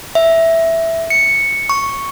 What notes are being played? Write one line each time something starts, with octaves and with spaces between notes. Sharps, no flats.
E5
C#7
C#6